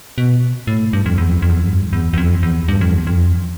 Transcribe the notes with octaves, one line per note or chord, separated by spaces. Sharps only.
B2
A2
G2
F2
E2
F2
F2
E2
F2
G2
E2
E2
F2
E2
G2
F2
E2
F2